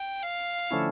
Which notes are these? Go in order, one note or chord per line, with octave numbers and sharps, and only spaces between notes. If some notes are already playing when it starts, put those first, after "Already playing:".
Already playing: G5
F5
D3 F3 A3 C#4 E4